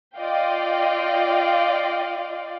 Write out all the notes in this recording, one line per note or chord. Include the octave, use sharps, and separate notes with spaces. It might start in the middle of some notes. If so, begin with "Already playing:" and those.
F4 D5 D#5 F5 G5